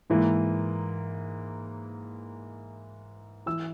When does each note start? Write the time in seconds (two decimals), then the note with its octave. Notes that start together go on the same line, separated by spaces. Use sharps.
0.10 G#2 E3 A#3
3.46 E3 E6